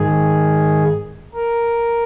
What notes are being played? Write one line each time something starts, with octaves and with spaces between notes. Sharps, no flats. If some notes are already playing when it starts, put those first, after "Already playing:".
Already playing: G#2 D#3 G#4
A#4